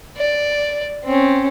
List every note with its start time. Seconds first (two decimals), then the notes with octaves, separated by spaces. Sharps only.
0.18 D5
1.05 C4 C#4